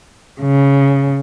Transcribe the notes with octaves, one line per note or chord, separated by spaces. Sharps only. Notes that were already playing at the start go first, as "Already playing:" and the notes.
C#3